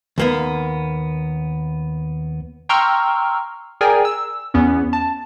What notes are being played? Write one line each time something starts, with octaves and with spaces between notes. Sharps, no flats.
D#2 A#3 B3
G5 A#5 C6 C#6 E6 F6
G#4 A#4 D5 G5 G#5 A#5
E6
E2 B3 C#4
A5